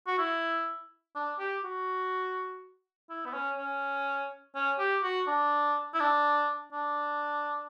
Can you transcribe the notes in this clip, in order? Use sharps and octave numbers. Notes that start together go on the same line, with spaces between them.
F#4
E4
D4
G4
F#4
E4
B3
C#4
C#4
C#4
G4
F#4
D4
E4
D4
D4